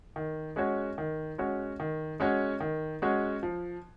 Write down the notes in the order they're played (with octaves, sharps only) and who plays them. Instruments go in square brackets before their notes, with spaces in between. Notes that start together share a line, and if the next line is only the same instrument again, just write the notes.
[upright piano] D#3
G#3 C#4 F#4 C#5
D#3
G#3 C#4 F#4 C#5
D#3
G#3 C#4 F#4 C#5
D#3
G#3 C#4 F#4 C#5
F3